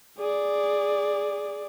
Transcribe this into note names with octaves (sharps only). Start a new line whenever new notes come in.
G#4 D5